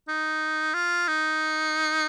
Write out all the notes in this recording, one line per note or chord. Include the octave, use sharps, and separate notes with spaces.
D#4
F4
D#4